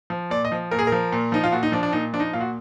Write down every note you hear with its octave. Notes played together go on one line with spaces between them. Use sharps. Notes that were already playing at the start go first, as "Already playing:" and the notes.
F3
A#2 D5
D#5
F3
A#2 A#4
G#4
A#4
F3
A#2
F3 D#4
F4
A#2 F#4
D#4
F3 D4
D4
A#2 D#4
F3 D4
D#4
A#2 F4
F#4